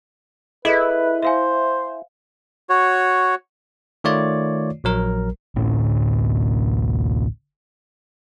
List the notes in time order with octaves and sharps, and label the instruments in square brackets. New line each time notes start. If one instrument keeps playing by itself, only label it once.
[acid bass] E4 [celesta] G#4 A4 D#5 [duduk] B4
[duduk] C5 [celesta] E5 F5 G#5
[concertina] F#4 C#5
[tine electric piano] D#3 A3 F4 C#5 D5
A#1 F#3 A#4
[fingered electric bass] A1 D2 A2 C#4